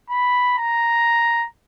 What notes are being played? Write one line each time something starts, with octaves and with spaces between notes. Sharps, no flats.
B5
A#5